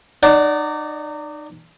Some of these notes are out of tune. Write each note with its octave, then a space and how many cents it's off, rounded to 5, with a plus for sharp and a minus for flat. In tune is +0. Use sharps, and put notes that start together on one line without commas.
D#4 -35 D5 -10 F#5 +0